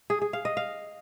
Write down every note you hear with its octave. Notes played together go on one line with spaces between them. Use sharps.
G#4
G#4
F5
D#5
F5